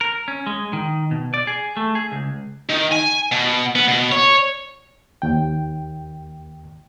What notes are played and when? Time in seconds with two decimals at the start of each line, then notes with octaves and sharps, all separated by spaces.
0.01 A#4
0.28 C#4
0.47 G#3
0.73 D#3
1.11 B2
1.34 D5
1.47 G#4
1.77 A3
1.95 G#4
2.12 C#2
2.70 D#3
2.92 G#5
3.32 B2
3.75 B3
3.88 B2
4.12 C#5
5.22 D#2 G5